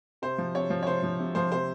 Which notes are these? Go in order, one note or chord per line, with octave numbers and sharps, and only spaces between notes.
C3 C5
F3
C3 C#5
F3
C#5
C3 C5
F3
C3
F3 C5
C3 C5